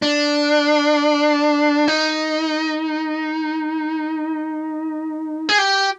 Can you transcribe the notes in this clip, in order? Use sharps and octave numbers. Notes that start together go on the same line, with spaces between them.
D4
D#4
G#4
G4